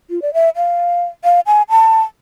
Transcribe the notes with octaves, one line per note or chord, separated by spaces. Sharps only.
F4
D5
E5
F5
F5
G#5
A5